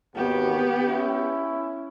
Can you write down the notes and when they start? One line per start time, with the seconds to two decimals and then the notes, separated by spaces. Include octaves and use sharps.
0.15 G#1 D#2 B3 F#4 G4
0.86 C#4 E4